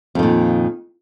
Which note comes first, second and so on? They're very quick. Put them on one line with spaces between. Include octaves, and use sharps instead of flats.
F2 D#3 A#2